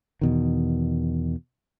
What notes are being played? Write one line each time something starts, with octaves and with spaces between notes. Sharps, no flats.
E2 B2 D#3